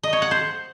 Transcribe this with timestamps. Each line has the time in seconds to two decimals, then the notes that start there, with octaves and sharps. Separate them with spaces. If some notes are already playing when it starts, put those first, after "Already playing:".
0.03 D#5
0.13 C#5
0.22 F#5
0.31 C5